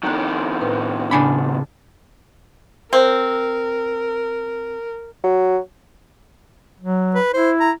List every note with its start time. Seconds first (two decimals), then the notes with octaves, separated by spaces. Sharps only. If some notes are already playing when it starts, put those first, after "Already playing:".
0.03 F2 D#3 D#4 A#5 F#6
0.61 A2 B4 C5
1.11 A2 C#3 D4 G#5 B5
2.93 C4 A#4
5.24 F#3
6.80 F#3
7.15 B4
7.33 E4 C5
7.60 A#5